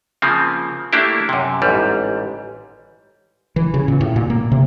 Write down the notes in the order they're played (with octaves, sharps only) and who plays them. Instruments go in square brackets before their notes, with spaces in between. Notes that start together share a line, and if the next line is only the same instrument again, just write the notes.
[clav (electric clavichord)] C#3 F3 A#3 C4
A3 A#3 D4 E4 G4
F#2 C3
A1 G#2 G3
[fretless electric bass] E3
C#3
A#2
A2
A#2
A#3
C3